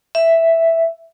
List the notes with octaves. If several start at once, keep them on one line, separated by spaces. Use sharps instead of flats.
E5